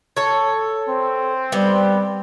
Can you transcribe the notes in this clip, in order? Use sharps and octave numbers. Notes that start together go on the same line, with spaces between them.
A4 C#5
C4
G3 B3 G4